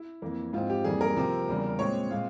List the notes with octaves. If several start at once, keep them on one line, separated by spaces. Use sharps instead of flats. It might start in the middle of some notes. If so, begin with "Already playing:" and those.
Already playing: E4
F2 E3 A#3
G#2 F3 C4 F4
G4
F2 E3 G3 A#3 G#4
A#4
C3 F3 C4
E2 C#3 G3
A#2 G#3 C4 C#5
A#2 G#3 C4 F5